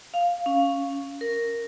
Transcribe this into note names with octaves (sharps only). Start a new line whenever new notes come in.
F5
C#4
A#4